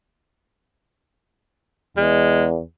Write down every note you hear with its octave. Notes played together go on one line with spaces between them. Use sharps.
E2 G#3